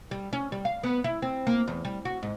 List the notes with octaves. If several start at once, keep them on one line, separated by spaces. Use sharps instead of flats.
G3
C#4
G3
F5
B3
E4
C4
A#3
E2
G3
F#4
G#2